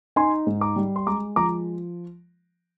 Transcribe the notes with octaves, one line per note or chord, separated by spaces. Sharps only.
D#4 G#5 C6
G#2
A#5 D6
G3
C6
G#3 A#5 D6
F3 A#5 D6